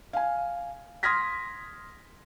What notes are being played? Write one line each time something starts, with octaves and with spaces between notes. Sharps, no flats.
F5 G#5
C6 D#6 F6 G#6 A#6 B6